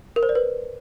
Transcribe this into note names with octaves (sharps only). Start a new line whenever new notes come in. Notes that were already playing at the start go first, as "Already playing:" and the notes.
A#4
C5
D5
B4